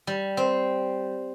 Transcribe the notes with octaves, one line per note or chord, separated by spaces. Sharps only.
G3
C4